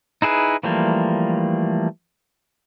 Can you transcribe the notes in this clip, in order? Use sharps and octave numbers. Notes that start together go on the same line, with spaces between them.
D#4 E4 G#4 B4
E3 F3 G3 A3 A#3